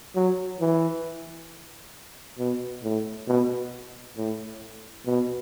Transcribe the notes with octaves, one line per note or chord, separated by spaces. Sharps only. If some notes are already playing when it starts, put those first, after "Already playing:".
F#3
E3
B2
A2
B2
A2
B2